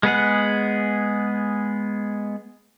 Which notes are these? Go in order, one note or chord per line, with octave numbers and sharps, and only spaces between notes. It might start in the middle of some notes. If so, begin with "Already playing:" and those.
G#3 B3 G#4 F#5